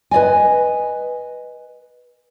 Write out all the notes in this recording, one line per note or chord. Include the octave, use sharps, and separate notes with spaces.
B4 D5 D#5 G#5